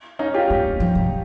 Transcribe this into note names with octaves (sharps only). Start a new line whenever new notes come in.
C#4 D#4
F4 G4
A#3
F3
C3